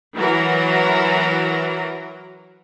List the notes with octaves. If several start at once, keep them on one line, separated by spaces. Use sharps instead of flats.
E3 F#3 E4 F#4 A#4 A#5